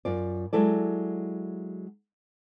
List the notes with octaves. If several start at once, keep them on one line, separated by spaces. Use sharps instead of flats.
F#2 F4 D5
F#3 G#3 E4 A4 D5